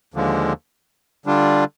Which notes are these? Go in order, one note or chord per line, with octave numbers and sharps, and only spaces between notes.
D#2 D3 F3 G#3
D3 G3 D4 F4